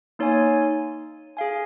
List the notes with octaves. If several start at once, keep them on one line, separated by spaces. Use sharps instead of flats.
A#3 D#4 C#5 G#5
G#4 F5 G#5